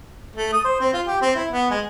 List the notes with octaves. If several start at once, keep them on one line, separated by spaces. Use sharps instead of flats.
A3
D#6
C5
C4
F4
G4
C4
E4
B3
G#3